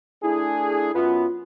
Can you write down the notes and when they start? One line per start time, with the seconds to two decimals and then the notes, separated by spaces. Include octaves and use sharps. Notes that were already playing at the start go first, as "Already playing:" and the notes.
0.23 A3 D4 E4 G#4
0.95 F#2 B3 F4